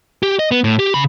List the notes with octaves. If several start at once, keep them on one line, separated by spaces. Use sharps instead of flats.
G4
D#5
B3
A2
G4
C#3 B5